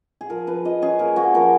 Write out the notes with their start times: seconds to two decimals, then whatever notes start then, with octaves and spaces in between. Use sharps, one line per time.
0.21 G#4
0.30 F3 A#4
0.47 F3 B4
0.65 F3 D#5
0.82 C#4 G#4
0.99 A#3 A#4
1.16 A#3 F#4
1.34 F3 A#4